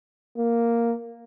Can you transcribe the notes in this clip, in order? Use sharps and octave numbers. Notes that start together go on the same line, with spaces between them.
A#3